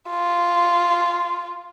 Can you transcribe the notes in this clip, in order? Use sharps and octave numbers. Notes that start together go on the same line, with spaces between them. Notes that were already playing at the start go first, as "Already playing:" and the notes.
F4